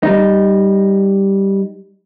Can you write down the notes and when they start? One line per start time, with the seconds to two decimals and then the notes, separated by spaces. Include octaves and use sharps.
0.03 G3 D#4